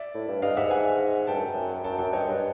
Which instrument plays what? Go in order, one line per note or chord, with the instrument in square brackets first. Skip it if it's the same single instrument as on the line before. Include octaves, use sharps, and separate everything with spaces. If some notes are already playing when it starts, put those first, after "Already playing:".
Already playing: [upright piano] D5 E5
[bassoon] A2
G2
[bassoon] G2 [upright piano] D#5 F5
[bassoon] G#2 [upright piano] E5 F#5
[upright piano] F#5 G#5
[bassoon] G2 [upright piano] G5 A5
[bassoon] F#2
F#2
[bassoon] F#2 [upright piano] G5 A5
[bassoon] F#2 [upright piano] G5 A5
[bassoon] G2 [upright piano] C#5 D#5
[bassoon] G2